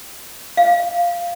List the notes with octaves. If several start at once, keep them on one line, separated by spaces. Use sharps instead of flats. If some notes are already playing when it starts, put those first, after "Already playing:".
F5